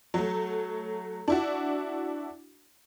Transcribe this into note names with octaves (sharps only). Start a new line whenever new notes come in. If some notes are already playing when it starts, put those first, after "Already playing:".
F#3 A3
D4 E4 F#4